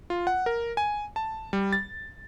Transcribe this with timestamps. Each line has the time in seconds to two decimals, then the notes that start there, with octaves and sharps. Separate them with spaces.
0.10 F4
0.27 F#5
0.46 A#4
0.77 G#5
1.16 A5
1.53 G3
1.73 A6